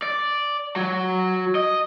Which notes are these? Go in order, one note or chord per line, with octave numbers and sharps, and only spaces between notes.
D5
F#3
D#5